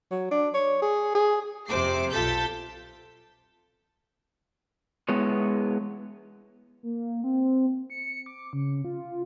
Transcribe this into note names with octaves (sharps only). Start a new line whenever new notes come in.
F#3
D4
C#5
G#4
G#4
F2 C3 C5 D6 C7
B1 F4 A4 G6 A6 B6
G#3 B3 E4 C#5
A#3
C4
C#7
D6
C#3
F4